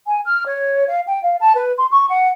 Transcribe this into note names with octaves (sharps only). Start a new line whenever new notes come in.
G#5
F6
C#5
F5
G5
F5
A5
B4
C6
C#6
F#5